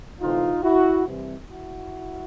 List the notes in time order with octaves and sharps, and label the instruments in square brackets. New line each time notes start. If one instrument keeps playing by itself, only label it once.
[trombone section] D2 C3 E3 A3 C4 D#4 F4
E4 F#4
C2 C3 E3
E4 F#4